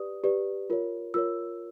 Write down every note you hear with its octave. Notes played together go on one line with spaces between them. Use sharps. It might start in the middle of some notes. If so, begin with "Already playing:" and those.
Already playing: G4 B4 D5 D#6
G4 B4 D5
F4 A#4 C#5
F4 A#4 C#5 E6